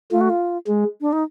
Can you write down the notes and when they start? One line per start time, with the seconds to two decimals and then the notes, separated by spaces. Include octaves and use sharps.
0.11 A3 F4
0.21 F#4
0.30 F4
0.67 G#3
1.01 D4
1.13 D#4